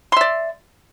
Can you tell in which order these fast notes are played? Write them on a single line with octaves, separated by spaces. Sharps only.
C6 E5 D5